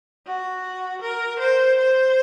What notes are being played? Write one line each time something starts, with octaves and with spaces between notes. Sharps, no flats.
F#4
A#4
C5
C5